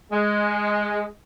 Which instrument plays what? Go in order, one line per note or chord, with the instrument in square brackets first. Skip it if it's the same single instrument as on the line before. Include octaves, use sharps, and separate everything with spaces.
[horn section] G#3